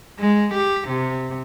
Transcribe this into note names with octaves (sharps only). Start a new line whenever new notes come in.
G#3
G4
C3